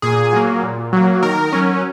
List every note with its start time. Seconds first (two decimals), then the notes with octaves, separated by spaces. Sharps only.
0.02 A#2 G#4
0.33 F#3 A#3
0.63 A#2
0.93 F#3 A#3
1.23 D#3 A#4
1.53 F#3 C#4